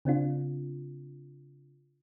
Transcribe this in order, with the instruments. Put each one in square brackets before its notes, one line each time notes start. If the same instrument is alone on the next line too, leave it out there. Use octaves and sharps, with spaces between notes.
[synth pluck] C#3 C4 D4 F4